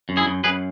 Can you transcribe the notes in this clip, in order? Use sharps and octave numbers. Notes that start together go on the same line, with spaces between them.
F#2
E4 G#4
F#2
F#2 G#4 B4